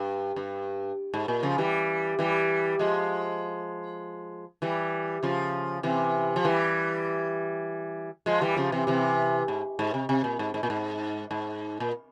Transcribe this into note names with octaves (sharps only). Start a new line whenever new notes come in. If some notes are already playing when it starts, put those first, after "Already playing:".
Already playing: G2
G2
G#2
A#2
C#3 F3
E3 G3
E3 G3
F3 G#3
E3 G3
C#3 F3
C3 E3
F3
E3 G3
F3 G#3
E3 G3
C#3 F3
C3 E3
C3 E3
G#2
G#2
C3
C3
A#2
G#2
G#2
A#2
G#2
G#2
A#2